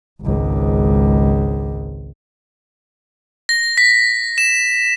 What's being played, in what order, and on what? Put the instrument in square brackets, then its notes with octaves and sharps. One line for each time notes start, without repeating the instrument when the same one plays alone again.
[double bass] G#1 C#2
[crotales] A#6
B6
E7